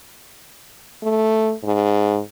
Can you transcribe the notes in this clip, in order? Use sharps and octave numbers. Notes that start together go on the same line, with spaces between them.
A3
G#2